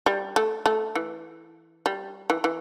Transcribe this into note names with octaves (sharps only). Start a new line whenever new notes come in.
G3
A3
A3
E3
G3
E3
E3